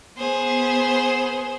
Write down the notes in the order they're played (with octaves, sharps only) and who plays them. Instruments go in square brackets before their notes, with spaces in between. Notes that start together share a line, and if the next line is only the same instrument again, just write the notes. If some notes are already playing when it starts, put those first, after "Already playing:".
[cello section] B3 [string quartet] G#4 C5